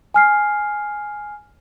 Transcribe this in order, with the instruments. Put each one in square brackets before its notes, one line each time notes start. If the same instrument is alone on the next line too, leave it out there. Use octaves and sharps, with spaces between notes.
[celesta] G#5 F6 C7